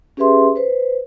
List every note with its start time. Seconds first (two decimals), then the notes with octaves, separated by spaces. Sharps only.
0.17 C#4 G4 G#4 B4 E5 C6
0.56 B4 C5